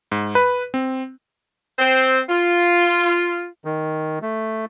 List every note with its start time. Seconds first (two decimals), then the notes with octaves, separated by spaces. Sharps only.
0.12 G#2
0.35 B4
0.74 C4
1.79 C4 C5
2.29 F4
3.65 D#3
4.22 A3